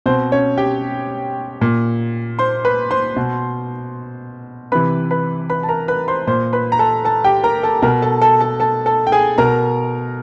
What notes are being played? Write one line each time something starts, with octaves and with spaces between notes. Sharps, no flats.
B2 C4 C5
C#4 C#5
G4 G5
A#2
C5 C6
B4 B5
C5 C6
B2
C3 E3 B4 B5
B4 B5
B4 B5
A5
A#4 A#5
B4 B5
C5 C6
A#2 C5 C6
B4 B5
A#5
A4 A5
A4 A5
G4 G5
A#4 A#5
A4 A5
B2 A#4 A#5
A4 A5
A4 A5
A4 A5
A4 A5
A4 A5
G5
G#4 G#5
B2 A#4 A#5